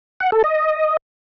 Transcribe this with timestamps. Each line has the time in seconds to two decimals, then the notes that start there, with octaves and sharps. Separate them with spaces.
0.20 F#5
0.32 A4
0.44 D#5